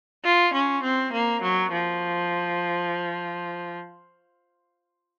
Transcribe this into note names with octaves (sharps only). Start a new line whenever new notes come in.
F4
C#4
C4
A#3
F#3
F3